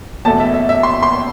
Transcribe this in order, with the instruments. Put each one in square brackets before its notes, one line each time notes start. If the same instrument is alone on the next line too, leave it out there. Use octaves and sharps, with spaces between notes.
[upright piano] E2 B2 A3 A5
E5
E5
E5
C6
C6